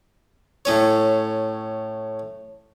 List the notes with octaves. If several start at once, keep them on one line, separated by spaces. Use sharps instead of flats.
A2 C#4 C#5